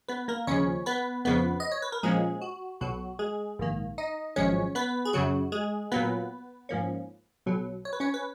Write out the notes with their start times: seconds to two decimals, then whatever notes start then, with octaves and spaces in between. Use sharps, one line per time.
0.08 B3 B4
0.28 A#3 A#4
0.47 D#2 C#3 F3 C#4 C#5
0.86 B3 B4
1.25 F2 C#3 F3 B3 B4
1.60 D#5
1.72 C#5
1.82 B4
1.92 A#4
2.03 A#2 F3 G#3 A#3 C#4 G#4
2.41 F#4
2.81 B1 B2 F#3 F#4
3.19 G#3 G#4
3.59 A#1 G#2 D#3 A#3
3.98 D#4 D#5
4.36 G#1 F#2 F3 G#3 C#4 C#5
4.75 B3 B4
5.05 G#4
5.13 F#2 C#3 F#3 F#4
5.52 G#3 G#4
5.92 A#2 F#3 A#3 B3 B4
6.69 G#2 F3 A#3 C#4
7.46 B1 B2 F#3
7.85 C#5
7.93 B4
8.00 C#4 C#5
8.14 B4